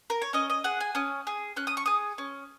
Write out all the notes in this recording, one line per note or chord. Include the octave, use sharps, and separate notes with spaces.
A#4
C#5
C#4 D#5
D#5
G#4 F#5
G#5
C#4 D#6
G#4
C#4 F#6
D#6
C#6
G#4 D#6
C#4